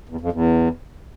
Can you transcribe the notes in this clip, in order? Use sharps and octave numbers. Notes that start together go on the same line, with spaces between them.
E2
F2
E2